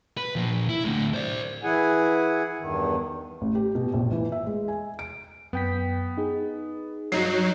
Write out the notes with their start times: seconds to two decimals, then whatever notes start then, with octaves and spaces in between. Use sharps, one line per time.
0.17 B4
0.36 A#2 F3
0.69 E4
0.85 A2 D3
1.14 C5 D5
1.63 E3 E4 G#4 F#5 G#5
2.59 E2 G2 D#3
3.41 A1
3.55 G4
3.75 B2
3.94 A#1
4.12 E3
4.32 E5
4.46 G#3
4.68 G#5
4.99 D7
5.53 F#2 B3 G5 B6
6.17 D#4 G#4
7.12 G2 F#3 D#4 C7